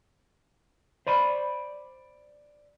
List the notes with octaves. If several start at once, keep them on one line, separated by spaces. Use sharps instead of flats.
C5 D5 B5